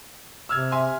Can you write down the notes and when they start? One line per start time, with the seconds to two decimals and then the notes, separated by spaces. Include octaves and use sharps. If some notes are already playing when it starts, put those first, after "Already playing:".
0.49 C3 E6 F6 G#6
0.72 E5 G#5 C6